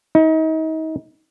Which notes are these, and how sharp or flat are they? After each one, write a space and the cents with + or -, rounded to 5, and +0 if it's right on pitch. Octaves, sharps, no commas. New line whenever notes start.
D#4 +35